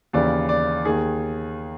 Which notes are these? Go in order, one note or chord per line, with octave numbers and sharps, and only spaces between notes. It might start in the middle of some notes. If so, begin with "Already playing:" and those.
D#2 C#3 E3 D5
D5
D#2 D#3 G#4